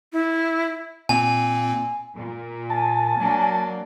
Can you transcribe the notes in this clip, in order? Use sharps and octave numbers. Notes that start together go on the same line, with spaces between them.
E4
A#2 A#3 C4 G#5
A#2
G#5 A5
F#3 A#3 D4